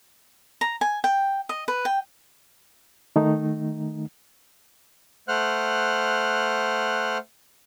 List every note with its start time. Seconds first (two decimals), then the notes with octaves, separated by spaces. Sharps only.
0.61 A#5
0.81 G#5
1.04 G5
1.49 D#5
1.68 B4
1.85 G5
3.16 D#3 A3 D#4
5.28 A3 C5 F#5 F6 F#6